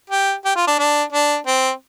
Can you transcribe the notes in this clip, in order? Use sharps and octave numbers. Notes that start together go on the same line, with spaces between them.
G4
G4
F4
D4
D4
D4
C4